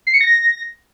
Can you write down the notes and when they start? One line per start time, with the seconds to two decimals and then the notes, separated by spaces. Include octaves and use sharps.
0.07 C7
0.14 C#7
0.21 A#6